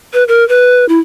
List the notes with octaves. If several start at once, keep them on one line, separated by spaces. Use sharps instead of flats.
B4
A#4
B4
E4